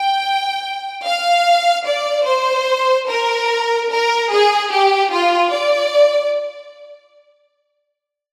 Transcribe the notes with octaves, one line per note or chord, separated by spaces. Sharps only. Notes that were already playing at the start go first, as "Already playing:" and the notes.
Already playing: G5
F5
D5
C5
A#4
A#4
G#4
G4
F4
D5